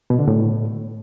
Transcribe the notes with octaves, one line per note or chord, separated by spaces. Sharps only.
B2
D3
A2